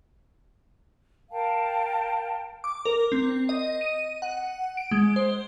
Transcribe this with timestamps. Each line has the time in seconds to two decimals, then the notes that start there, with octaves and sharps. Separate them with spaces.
1.31 A#4 F5 G5 A5
2.64 D6
2.85 A#4
3.12 C4
3.49 D#5
3.81 D#7
4.22 F#5
4.77 D7
4.91 G#3
5.16 C5